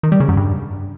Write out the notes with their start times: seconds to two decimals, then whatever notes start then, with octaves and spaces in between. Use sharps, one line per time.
0.03 D#3
0.12 G3
0.20 C#3
0.29 F#2
0.37 G2